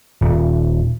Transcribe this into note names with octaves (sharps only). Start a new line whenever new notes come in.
D#1